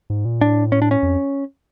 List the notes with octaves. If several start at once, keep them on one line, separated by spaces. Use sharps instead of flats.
G#2
A#2
A2 D4
C#4
D4
C#4
F2